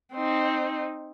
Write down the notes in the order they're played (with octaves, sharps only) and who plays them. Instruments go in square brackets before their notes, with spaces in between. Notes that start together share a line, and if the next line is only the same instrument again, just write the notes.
[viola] C4 D#4